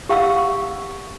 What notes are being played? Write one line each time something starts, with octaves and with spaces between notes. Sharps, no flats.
G4 F5 F#5 C#6 E6